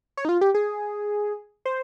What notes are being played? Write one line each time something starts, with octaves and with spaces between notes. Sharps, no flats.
C#5
D#4
F4
G4
G#4
C5